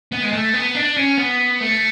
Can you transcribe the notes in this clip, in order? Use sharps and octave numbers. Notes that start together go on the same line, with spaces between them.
B3
G#3
A3
B3
D4
C#4
B3
A3